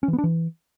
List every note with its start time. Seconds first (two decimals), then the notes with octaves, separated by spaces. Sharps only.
0.03 C#4
0.08 E3
0.13 B3
0.18 D4
0.24 E3